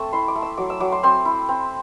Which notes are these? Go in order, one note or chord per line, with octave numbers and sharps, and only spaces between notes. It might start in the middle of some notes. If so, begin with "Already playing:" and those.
Already playing: A3 C4 A5
E4 C6
D6
A3
E6
F#3 D6
E6
F#3 D6
C6
C4 C6
E4
C4